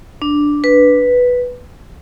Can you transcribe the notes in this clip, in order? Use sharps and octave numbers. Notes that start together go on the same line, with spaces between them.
D4
B4